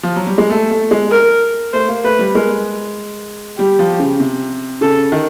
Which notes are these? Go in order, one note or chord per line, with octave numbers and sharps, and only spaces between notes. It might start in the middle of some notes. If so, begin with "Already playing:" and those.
F3
F#3
G3
G#3
A3 A4
A3
G#3
A#4
A3 C5
A#3
A3 B4
G3
G#3 A#4
G3 G4
F3
C#3
C3
C#3 A4
D#3